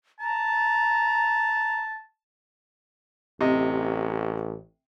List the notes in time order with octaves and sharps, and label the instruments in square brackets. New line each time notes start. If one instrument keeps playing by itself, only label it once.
[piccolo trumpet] A5 [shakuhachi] A#5
[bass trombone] A1 [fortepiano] C3 D#5